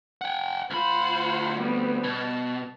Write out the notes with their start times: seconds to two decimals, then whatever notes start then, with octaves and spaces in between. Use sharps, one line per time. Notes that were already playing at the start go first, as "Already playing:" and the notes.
0.21 F#5 G5
0.70 D2 F4 C5 F#5 B5
1.58 G3 B3 C4
2.04 B2 A5